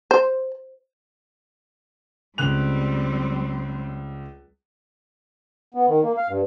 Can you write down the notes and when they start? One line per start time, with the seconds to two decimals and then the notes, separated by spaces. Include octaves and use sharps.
0.11 C5
2.38 C#2 G3 C4 F#6 F7
5.75 B3
5.88 D#3
6.04 A#3
6.17 F5
6.29 G2